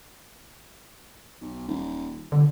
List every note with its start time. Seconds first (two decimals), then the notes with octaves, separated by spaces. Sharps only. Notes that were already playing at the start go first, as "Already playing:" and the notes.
1.41 B1
1.68 D#1
2.32 G1 D3